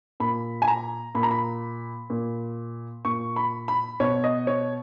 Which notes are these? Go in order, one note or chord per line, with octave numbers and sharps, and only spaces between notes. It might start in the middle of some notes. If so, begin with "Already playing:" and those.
A#2 B5
G#5
A#5
A#2 B5
A#5
B5
A#2
A#2 C#6
B5
B5
B2 C#5
D#5
C#5